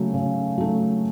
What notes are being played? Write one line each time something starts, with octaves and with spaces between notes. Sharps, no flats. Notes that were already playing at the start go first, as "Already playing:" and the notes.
Already playing: C#3 F#3 A3
C#3
F#3 A3